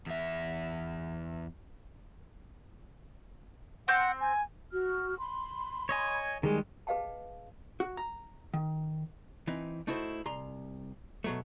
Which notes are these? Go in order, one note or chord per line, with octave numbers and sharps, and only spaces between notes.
E2 E5
C4 F#5 G6
G#5
F#4 F6
B5 C6
C#5 D#5 G#5
D#3 G3 G#3 G#4
G#4 B4 D#5 F5 G5 A5
F#4
A#5
D#3
E3 C4 D#4
A3 D#4 E4 F#4 C5
C2 A#5 C6
B2 F#3 A3